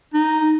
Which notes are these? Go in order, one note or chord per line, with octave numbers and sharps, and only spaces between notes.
D#4